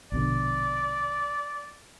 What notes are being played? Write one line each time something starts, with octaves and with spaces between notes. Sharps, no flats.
A#1 B2 D3 D5